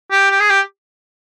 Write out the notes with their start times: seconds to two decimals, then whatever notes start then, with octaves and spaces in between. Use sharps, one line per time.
0.11 G4
0.31 G4
0.40 G#4
0.50 G4